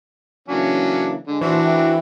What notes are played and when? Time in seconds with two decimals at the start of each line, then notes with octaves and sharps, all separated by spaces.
0.48 C#3 E3 F#3 A#3 C#4 D4
1.27 D3 G#3
1.41 A#2 E3 D4 F#4 C5 E5
1.61 A3 C4